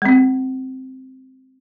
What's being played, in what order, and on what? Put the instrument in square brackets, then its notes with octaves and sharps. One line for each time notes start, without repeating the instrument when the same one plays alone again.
[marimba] G#3 C4